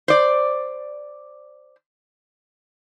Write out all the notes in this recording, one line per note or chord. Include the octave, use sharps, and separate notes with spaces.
C5 D5